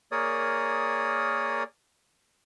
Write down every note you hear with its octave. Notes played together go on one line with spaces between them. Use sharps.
A#3 G#4 A#4 C#5 D5 D#6